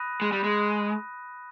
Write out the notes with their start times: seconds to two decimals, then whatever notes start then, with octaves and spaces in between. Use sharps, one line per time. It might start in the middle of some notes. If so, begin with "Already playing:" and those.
Already playing: B5 D#6 F#6 A#6 D#7
0.21 G#3
0.32 G3
0.44 G#3